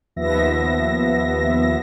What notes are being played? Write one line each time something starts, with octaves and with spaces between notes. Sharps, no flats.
D#2 F3 B3 E5 A#6